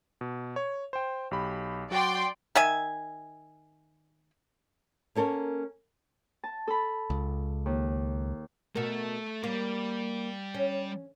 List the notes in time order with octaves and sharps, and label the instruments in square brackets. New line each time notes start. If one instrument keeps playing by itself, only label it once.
[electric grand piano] B2
C#5
C5 G5
B1 G4 B5
[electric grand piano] F#3 F#4 [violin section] D5 G5 C6
[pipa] D#3 E5 G#5
[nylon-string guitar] A#3 C#4 A4 A#4 C#5
[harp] A5
A4 B5
[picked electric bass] C#2
[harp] D#2
[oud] B2 A#4 [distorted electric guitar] A3 A4
[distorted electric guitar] G3 [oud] A#3
[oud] C#4